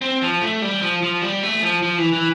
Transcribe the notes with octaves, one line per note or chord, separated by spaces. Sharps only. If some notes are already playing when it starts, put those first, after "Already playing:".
C4
F3
A3
G3
F3
F3
G3
A3
F3
F3
E3
E3